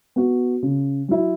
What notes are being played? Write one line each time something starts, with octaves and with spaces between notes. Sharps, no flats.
B3 F#4
C#3
F#3 E4